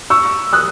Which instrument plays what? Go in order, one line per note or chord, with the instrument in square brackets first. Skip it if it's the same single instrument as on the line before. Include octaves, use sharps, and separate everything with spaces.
[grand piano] C#6 E6
D#6 F#6